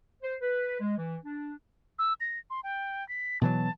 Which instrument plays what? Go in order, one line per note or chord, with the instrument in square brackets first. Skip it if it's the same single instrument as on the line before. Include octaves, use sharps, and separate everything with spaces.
[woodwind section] C5
B4
G#3
E3
D4
[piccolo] E6
A#6
C6
G5
B6
[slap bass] B2 E3 F#3 [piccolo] A5